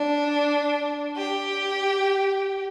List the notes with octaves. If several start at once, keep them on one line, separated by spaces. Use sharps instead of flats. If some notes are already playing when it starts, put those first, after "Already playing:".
Already playing: D4
G4